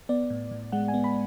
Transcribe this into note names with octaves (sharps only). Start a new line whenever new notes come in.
B3 D5
A2
A2
G#3 F#5
G#5
B3
B5